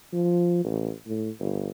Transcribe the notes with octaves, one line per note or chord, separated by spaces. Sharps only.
F3
A1
A2
G1